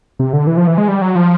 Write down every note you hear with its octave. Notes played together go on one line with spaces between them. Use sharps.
C3
D3
E3
F3
E3
G#3
G3
F#3
F3